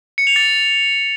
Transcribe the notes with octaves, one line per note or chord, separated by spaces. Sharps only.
C#7
F7
A6